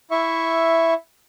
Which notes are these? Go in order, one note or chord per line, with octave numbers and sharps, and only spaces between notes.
E4 E5 C#6